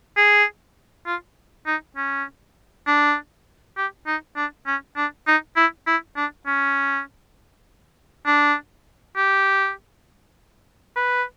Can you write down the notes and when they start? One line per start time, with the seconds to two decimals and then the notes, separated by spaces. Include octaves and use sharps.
0.17 G#4
1.07 F4
1.67 D#4
1.97 C#4
2.87 D4
3.77 G4
4.07 D#4
4.36 D4
4.67 C#4
4.97 D4
5.27 D#4
5.57 E4
5.87 E4
6.16 D4
6.46 C#4
8.26 D4
9.16 G4
10.96 B4